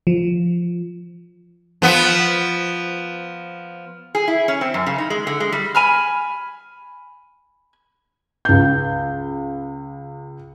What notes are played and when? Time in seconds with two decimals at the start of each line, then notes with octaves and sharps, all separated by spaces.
0.07 F3
1.82 F3 B3
4.15 G#4
4.28 E4
4.48 C#4
4.61 C4
4.74 F#2
4.86 C#3
4.98 D#4
5.10 G#3
5.27 D3
5.40 G#3
5.52 G3
5.75 G#5 B5 F6
8.45 C#2 G6